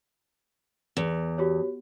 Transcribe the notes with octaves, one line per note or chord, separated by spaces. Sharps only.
E2
F#4 G4 C#5